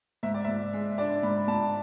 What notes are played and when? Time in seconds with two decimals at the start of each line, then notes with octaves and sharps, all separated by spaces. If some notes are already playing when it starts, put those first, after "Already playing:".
0.23 G#2 E5
0.34 D5
0.44 G#2 E5
0.73 G#3
0.98 D4 D5
1.23 G#2 B5
1.48 G#2 A5